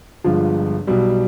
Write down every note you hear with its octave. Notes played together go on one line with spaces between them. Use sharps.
G1 G2 F3 G#3 F4
B1 B2 G3